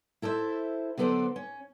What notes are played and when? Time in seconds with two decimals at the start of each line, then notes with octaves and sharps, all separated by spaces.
0.22 E4 A4 C5 D5 E5
0.98 D3 F#3 B3 A4 C5 D5
1.36 C#4